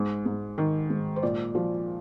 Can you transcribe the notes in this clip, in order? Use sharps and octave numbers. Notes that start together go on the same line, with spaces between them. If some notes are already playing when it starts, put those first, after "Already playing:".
Already playing: G#2
G#2
D#3
G#2
C5
A#2 D5
F3